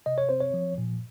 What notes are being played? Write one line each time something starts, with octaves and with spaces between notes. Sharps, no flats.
C3 D#5
C#5
C4 C5
C#5
F3
A#2